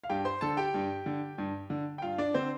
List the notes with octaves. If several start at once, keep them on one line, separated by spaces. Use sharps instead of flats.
F5
G2 G4 G5
C5 C6
D3 A4 A5
G4 G5
G2
D3
G2
D3
G5
G2 F4 F5
D4 D5
D3 C4 C5